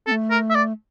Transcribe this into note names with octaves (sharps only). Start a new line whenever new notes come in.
C4 A4
A3
A#4
E5
D5